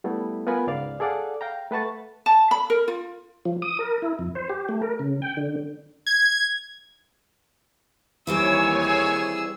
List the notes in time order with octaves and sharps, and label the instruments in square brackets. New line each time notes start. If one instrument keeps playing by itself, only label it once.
[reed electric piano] G3 A3 B3 E4
B3 F4 A#4 F#5 G#5 B5
C#2 G#2 D5 F5 F6
G#4 A4 D5 F5 F#5
F5 G5 A#5
A3 B4 F#5 A5 C#6 A6
[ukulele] A5
B5
A#4
F4
[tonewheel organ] F3
D#6
A#4
E4
F2
C5
G4
A3
A#4
C#3
G5
D3
[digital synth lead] G#6
[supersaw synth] D#2 C#5 G#5 [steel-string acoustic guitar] E3 G3 C4 [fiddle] E6
[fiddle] G#4 E6